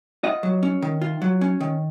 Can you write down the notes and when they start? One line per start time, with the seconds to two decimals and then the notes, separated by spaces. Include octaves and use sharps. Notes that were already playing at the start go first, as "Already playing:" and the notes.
0.23 F4 D#5 F#5
0.43 F#3
0.63 C#4
0.82 D#3
1.01 F4
1.22 F#3
1.41 C#4
1.60 D#3